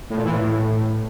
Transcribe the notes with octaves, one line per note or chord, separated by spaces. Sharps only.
A2
A#2
E3
A2